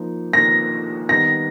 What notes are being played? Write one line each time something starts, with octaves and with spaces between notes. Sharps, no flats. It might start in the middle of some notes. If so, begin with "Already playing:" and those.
Already playing: F3 A#3 D#4
F3 A#3 D#4 A#6
D#3 G3 B3 D#4 A#6